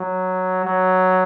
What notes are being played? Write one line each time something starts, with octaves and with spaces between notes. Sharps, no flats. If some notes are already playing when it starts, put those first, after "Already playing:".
Already playing: F#3
F#3